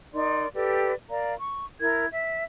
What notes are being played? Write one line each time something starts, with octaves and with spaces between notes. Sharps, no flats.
D#4 A#4 D5 C6
G4 A4 B4 D5
A#4 D5 F5 A#5
C#6
E4 A#4 G#6
E5